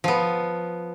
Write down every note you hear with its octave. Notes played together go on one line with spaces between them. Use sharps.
F3 B3